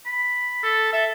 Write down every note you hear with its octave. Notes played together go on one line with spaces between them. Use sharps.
B5
A4
A4 E5